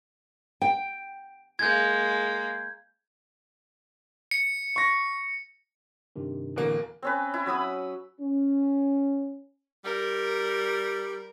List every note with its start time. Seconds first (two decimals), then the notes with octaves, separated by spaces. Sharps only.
0.62 G5
1.59 G#3 A#3 G6 G#6
4.31 C#7
4.76 C#6 A#6
6.16 G2 C3 D#3
6.56 D1 E2 D3 E3 A#3
7.02 C4 C#4 B4
7.34 E4
7.46 F#3 B5 D#6 E6
8.21 C#4
9.85 G3 A#4